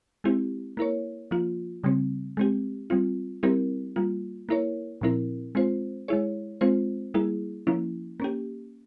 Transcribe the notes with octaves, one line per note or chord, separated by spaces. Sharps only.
G#3 C4 E4 G4
A#3 E4 A#4 C#5
F3 A#3 F4
C#3 G3 C4
G#3 C4 G4
G3 C4 F4
G3 C4 E4 G4 A#4
G3 A#3 F4
A#3 E4 A#4 C#5
A#2 F3 C4 E4 A#4
G#3 C4 F4 C5
G#3 E4 G#4 C#5
G#3 C4 F4 C5
G3 A#3 E4 G#4
F3 A#3 C#4 E4
A#3 C#4 G4